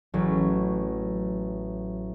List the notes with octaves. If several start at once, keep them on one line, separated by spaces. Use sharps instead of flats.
A1 F#3